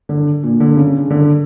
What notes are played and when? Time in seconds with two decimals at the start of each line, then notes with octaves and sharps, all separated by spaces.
0.09 D3
0.43 A#2
0.60 D3
0.77 C#3
1.10 D3